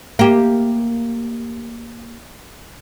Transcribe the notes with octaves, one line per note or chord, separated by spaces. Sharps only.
A#3 G4